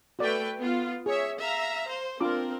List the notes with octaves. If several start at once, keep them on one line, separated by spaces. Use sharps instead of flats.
A3 F#4 B4 D5 G5
B3 F4
G#4 C#5 E5
E5 F5 A#5
C5
C4 D4 F4 A#4 D6